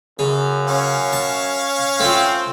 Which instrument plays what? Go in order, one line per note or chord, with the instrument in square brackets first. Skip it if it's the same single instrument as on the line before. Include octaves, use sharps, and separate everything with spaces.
[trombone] F#2 [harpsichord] C#3
[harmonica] C#4 F5
[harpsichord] A5
[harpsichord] A3 F4 [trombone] C4